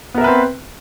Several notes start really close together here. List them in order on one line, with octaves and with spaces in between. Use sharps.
B3 A#4 E5 B4 C4